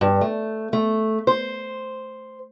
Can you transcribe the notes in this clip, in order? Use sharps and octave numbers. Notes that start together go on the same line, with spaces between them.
G2
A3
A3
C5